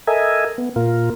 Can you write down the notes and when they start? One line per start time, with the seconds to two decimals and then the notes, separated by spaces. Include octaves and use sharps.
0.07 A4 A#4 D#5 E5 G#5
0.58 B3
0.76 A#2 F4 A#4